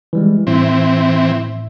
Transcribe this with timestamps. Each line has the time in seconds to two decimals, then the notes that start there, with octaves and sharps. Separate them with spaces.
0.13 E3 G3 G#3
0.47 A2 E3 C4 E4 E5